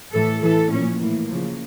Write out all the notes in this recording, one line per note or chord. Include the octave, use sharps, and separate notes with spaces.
A2 E3 A4
A2 E3 A4
A#2 F3 C#4
A2 E3 A#3
C#3 F3